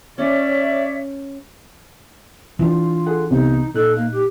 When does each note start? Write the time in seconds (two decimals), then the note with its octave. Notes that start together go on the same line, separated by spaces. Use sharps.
0.18 C#4 C#5 D5 E5
2.59 E3 D4 F4
3.06 G#4 A4 F#5
3.30 C2 C3 B3 D#4
3.74 A#2 D#4 A4 F#6
3.95 A#3
4.12 G4